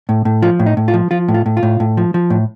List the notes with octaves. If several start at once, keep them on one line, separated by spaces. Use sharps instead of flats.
A2
A2
F3 F4
A2
D#4
A2
F4
F3
F3 F4
A2
F4
A2
F4
A2
A2
F3
F3
A2